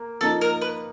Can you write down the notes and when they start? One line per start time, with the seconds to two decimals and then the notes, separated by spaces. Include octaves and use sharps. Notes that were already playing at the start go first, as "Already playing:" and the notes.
Already playing: A#3
0.21 F3 A#3 D#4 A4
0.41 A#4
0.61 B4